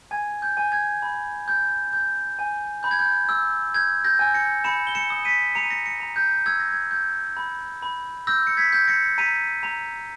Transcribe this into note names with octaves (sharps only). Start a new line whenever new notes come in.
G#5 G#6
G6
G#5
G#6
B5
G6
G6
G#5
B5 G6
G#6
G6
E6
G6 G#6
G6 A#6
G#5
A#6 C#7
B5 C#7 E7
G7
C#7 E7
D#6
B6 D#7
A#5 C#7
D#7
A#6 C#7
A#6 C#7
A#5
G6
E6 G#6
A#6
G#6
G6
B5
B5
E6 G6 A#6
C#7
G#6 B6
G6
A#6 C#7
A#5 B6 D#7
A#5